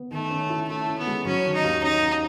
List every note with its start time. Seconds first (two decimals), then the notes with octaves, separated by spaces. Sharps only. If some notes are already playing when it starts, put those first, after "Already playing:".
Already playing: B3
0.11 D#3 A3
0.30 C#4
0.50 E4
0.68 A3 E4
0.88 C#4
0.98 B3
1.07 G#3
1.25 F#3 C#4
1.45 D#3
1.54 D#4
1.64 D#2
1.83 C#4 D#4
2.02 C#4